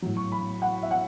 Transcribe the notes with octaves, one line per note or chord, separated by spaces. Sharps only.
A2 F#3
C#6
B5
F#5
E5
F#5